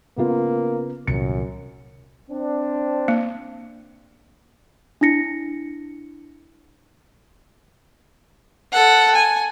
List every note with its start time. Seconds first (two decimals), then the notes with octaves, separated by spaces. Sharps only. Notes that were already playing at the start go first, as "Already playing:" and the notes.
0.17 C#3 A#3 B3 F4
1.07 C2 F#2 A#2 D#3 C#7
2.30 C4 D4
3.08 A#3
5.01 D4 E4 A#6 C#7
8.72 A4 F#5
9.15 G#5